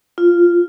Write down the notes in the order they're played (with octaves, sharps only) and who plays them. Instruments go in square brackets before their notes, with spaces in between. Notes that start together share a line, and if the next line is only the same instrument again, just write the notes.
[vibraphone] F4